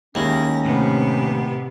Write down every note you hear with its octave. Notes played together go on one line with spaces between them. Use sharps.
D#2 G#3 C#4 E4 A#6
A2 C3 B3